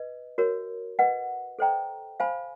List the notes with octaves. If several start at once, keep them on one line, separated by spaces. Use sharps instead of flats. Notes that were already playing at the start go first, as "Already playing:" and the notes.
Already playing: B4 D#5
F#4 A#4 C#5
B4 D#5 F#5
A4 C5 D#5 G5 A#5
C5 F5 G#5 B5